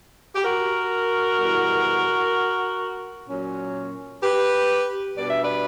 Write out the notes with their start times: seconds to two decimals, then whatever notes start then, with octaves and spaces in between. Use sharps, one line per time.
0.36 G4
0.45 F#4 A#4
1.39 E2 B2 G3
3.29 A#2 F#3 C#4
4.23 G4 B4
5.17 B2 G3 B3 D4 D5
5.30 E5
5.43 B4 D5